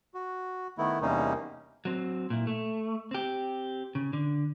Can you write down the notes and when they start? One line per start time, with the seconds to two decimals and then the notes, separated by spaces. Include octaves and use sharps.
0.14 F#4
0.78 D#3 A3 B3 E4
1.02 E2 C3 G3 A#3 C#4 D#4
1.85 F#3 C4
2.30 A#2 E4
2.47 A3
3.11 C4 G4
3.95 C#3
4.13 D3